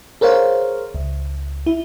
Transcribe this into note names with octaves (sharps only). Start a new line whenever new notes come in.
G#4 A#4 C5 C#5 F5
C#2
E4